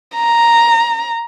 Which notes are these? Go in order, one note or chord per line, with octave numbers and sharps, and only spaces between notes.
A#5